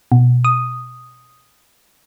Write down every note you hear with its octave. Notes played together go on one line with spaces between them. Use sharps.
B2
D#6